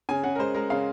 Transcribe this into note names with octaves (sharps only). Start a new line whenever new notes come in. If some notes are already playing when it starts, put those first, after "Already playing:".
C#3 G#5
C#3 F#5
A#4
G#3 C5
G#3 A#4
C#3 F5